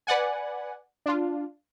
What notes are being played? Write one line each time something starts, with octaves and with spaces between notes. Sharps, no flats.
B4 D5 F#5 G#5
D4 F4